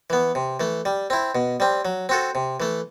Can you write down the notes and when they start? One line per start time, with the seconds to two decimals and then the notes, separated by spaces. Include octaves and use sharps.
0.10 E3 B3
0.35 C3
0.60 E3 A3
0.85 G3
1.10 C4 E4
1.35 B2
1.60 G3 C4
1.85 F#3
2.09 C4 F#4 A4
2.35 C3
2.60 E3 A3